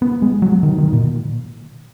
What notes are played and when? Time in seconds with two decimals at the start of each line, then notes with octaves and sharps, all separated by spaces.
0.02 B3
0.22 G#3
0.42 F#3
0.63 D#3
0.78 D#3
0.93 A#2